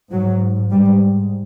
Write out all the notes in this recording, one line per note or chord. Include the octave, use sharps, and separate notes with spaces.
G#2 F#3
G#2 G3